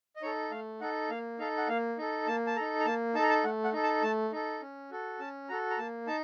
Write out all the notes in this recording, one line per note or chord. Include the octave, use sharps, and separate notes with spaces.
D#5
D#4 A4 C#5
A3 F5
D#4 A4 F#5
A#3 F5
D#4 A4 F5
F#5
A#3 F5
D#4 A4
A#3 A5
A5
D#4 A4 A#5
A#5
A#3 A5
D#4 A4 A5 A#5
A5
A3 F#5
F#5
D#4 A4
A5
A3 A5
D#4 A4
C#4
F#4 A4
C#4 A5
F#4 A4 A#5
A#5
A#3 A5
D#4 A5